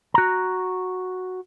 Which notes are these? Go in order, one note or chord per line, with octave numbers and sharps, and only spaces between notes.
F#4 A#5